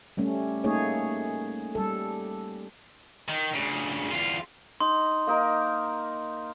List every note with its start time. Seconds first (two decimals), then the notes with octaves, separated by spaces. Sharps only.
0.17 G3 A3 C#4
0.64 A3 A#3 D#4 G#4 C#5
1.75 G3 A4
3.29 D#3
3.54 D2 C#3
4.11 E2 F4
4.80 D#4 C6
5.27 A#3 D#4 A#4